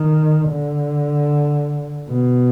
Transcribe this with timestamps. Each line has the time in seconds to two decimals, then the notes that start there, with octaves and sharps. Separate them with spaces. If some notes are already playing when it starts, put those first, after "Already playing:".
Already playing: D#3
0.49 D3
2.09 B2